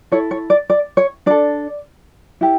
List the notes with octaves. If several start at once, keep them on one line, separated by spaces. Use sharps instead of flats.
E4 A4 C#5
C#5
D5
D5
C#5
D4 A4 D5
E4 G4